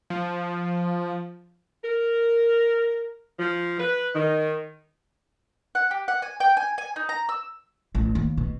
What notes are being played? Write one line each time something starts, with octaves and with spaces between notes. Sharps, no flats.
F3
A#4
F3
B4
D#3
F#5
G4
F#5
G#5
G5
G#5
G#5
D#4
A#5
E6
A1
D#2
B2